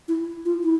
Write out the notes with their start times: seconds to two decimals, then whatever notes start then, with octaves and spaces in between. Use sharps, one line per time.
0.08 E4
0.45 F4
0.63 E4